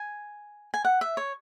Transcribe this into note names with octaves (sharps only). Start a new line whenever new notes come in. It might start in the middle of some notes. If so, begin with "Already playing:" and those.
Already playing: G#5
G#5
F#5
E5
C#5